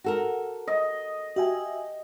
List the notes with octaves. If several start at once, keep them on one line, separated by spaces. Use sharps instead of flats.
F#4 A4 A#4
D#5
F#4 G4 E5 G#5